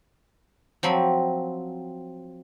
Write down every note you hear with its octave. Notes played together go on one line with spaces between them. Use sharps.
F3 F#3 C4 B5